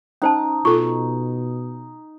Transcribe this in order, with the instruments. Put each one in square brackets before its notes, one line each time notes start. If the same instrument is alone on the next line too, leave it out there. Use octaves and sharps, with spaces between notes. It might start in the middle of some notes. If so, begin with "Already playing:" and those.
[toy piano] C#4 C5 A5 [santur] D#4
[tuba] B2 [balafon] F4 A4 [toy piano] C#6